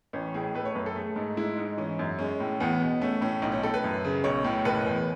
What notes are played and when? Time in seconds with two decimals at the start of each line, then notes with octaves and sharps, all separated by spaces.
0.13 A1 C#4
0.34 A2 G#4
0.54 A3 B4
0.65 C#5
0.75 F#2 B4
0.86 A4
0.95 A3 G#4
1.16 G#2
1.37 G#3 E4
1.57 G#2 D#4
1.78 E3 C#4
1.99 F#2
2.19 G#3 C#4
2.40 A2
2.60 E2 B3
2.81 B2
3.01 A3 C#4
3.21 A2 C#4
3.42 B1 D#4
3.52 C#4
3.63 A2 A4
3.74 B4
3.84 F#2
4.05 C#3
4.24 B1 C#5
4.44 A2
4.65 F#1 B4
4.86 E2